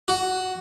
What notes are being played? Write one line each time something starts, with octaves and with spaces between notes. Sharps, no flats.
F#4